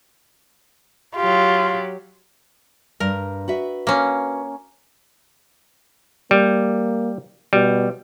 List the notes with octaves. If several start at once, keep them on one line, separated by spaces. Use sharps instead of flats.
F#3 F4 G4
G2 A#4
F#4 B4 E5
A#3 C#4
G3 A#3
B2 G3